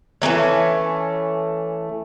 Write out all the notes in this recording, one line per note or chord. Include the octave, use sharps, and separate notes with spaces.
E3 A3 A#3 C#4